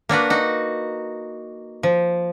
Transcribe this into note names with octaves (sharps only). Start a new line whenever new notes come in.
A#3 D4 F#4 B4
D#4 F#4
F3